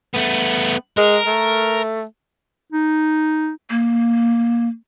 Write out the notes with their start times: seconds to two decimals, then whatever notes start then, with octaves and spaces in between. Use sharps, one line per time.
0.14 A3 B3
0.97 G#3 A#4
1.27 A3
2.72 D#4
3.70 A#3